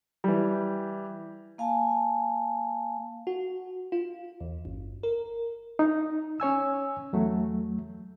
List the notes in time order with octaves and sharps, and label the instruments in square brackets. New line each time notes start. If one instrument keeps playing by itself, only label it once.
[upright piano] E3 G3
[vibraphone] A#3 F5 G#5 A5
[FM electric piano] F#4
F4
E2
G1
A#4
[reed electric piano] D#4
C#4 C#5 G#5 E6
E2 F#3 A3